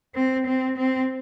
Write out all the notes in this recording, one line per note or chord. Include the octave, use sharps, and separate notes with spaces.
C4
C4
C4